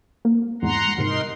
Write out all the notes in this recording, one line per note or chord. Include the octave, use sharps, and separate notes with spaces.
A#3
E2 G#2 F#5 A#5 C6
G#2 C3 D#4 A#4 C6 C7